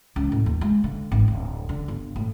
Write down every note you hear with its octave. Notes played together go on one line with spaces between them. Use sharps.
C#2
A2
D#2
G#3
D3
G#1
D1
D3
G1
A2